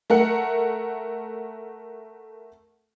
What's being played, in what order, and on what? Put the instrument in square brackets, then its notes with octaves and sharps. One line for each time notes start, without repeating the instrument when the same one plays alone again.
[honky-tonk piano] A3 A#4 F#5